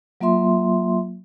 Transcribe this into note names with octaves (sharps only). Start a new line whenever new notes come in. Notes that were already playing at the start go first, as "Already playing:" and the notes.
F#3 A#3 F4 E5 C6